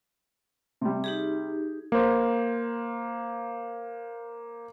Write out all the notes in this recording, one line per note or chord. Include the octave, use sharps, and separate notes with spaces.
C3 G3
D#4 G4 G#4
A#3 C5